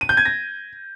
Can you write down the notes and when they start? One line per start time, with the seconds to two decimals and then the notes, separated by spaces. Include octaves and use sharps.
0.01 D#7
0.09 G6
0.17 G#6
0.25 A#6